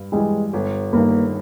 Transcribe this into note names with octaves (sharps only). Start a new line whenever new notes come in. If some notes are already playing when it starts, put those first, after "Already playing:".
Already playing: G2
E3 G3 G#3
G1
G2 D#3 A#3